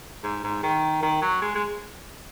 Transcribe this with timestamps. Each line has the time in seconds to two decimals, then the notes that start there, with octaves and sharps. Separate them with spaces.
0.24 G#2
0.44 G#2
0.63 D#3
1.03 D#3
1.22 F#3
1.42 G#3
1.55 G#3